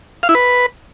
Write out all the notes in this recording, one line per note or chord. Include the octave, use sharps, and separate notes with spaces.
F5
E4
B4